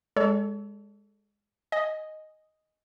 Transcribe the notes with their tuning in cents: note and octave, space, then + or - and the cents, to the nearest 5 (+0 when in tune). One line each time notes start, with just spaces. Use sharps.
G#3 -15 A4 +0 C#5 +40
D#5 +0 G#5 +0